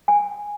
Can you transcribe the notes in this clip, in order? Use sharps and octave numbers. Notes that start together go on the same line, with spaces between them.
G#5